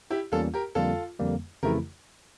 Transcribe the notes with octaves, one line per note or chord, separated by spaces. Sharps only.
E4 G4
E2 E3 G3 A#3 C#4 F4 A4
G4 A#4
F2 D3 G3 A#3 F4 A4
F2 D3 G3 A#3
F2 C#3 E3 A3 E4 G4 A#4